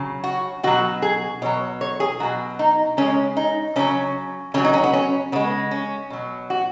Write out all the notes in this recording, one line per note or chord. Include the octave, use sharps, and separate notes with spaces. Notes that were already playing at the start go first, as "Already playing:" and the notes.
Already playing: C#3 F#3
F#4
B2 F#3 F#4
G#4
B2 F#3 C#5
C#5
G#4
B2 F#3 F#4
D#4
C#3 G#3 C#4
D#4
C#3 F#3 C#4
C#3 F#3 C#4
D#4
C#4
B3
C#4
C#3 G#3 B3
C#4
B2 F#3
F#4